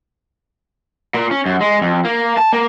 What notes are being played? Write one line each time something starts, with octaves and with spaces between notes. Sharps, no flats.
A#2
C#4
F#2
G#3
F2
A#3
A5
A#3